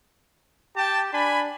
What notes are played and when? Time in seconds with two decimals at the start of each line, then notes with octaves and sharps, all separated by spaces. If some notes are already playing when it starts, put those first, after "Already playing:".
0.76 G4 G5 A5
1.13 D4 G#5 B5